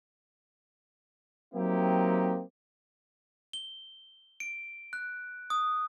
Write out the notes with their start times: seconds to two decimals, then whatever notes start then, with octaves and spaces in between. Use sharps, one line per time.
1.54 F#3 A#3 C4 D#4 E4 G4
3.53 G7
4.40 D7
4.93 F#6
5.50 D#6